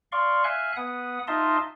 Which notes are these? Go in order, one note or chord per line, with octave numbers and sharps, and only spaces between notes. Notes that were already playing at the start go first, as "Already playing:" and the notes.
D5 F5 C6 C#6
E5 F5 G#5 F#6
B3 F#5 D#6
D#4 F4 D#5 E5 A5 C6